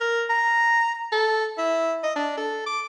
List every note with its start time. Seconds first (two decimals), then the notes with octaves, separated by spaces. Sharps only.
0.01 A#4
0.29 A#5
1.12 A4
1.58 E4
2.03 D#5
2.16 D4
2.37 A4
2.66 D6